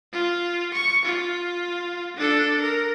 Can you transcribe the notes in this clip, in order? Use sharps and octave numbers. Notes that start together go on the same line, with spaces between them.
F4
C#6
F4
D4 A4
A#4